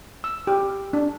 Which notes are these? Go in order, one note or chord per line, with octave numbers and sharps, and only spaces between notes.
E6
G4
D4